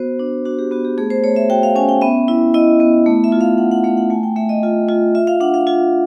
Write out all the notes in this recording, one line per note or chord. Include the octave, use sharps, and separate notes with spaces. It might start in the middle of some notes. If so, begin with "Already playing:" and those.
Already playing: B3 F#4 C5
D4
D4 F#4
G4
B3 F#4
G4
A3 G#4
C5
A3 C#5
E5
F#4 G5
F5
C#4 G#5
G5
B3 E5
E4
E4 D#5
B3
A3
E5
F4
F5
C#4 F#5
F#5
A3 F5
F#5
A3 G#5
G5
A3 E5
D#5
F4
F4
F4 E5
F5
D4 F#5
F5
F4